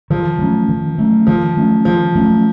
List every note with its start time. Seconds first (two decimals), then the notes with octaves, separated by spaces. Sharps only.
0.10 D#3 F3
0.39 F#3 A3 C#4
0.69 D#3
0.98 F#3 A3 C#4
1.27 D#3 F3
1.57 F#3 A3 C#4
1.85 D#3 F3
2.15 F#3 A3 C#4